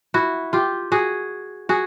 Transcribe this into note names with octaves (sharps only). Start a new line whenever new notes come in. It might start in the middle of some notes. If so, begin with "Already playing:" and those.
E4 F#4
F4 G4
F#4 G#4
F#4 G#4